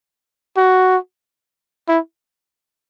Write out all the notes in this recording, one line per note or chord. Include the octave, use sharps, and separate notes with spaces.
F#4
E4